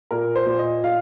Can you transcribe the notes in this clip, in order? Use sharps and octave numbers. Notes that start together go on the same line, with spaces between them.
A#2 A#4
C5
A#2
D#5
A#2 F5